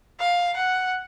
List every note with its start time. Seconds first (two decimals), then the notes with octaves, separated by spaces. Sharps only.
0.20 F5
0.57 F#5